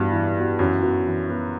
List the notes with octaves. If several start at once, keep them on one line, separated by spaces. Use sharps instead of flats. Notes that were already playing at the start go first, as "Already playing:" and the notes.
Already playing: G2 E3 G3 B3 F#4
E3
B3 F#4
F#2 E3 F#3
B3 F#4
E3
B3 F#4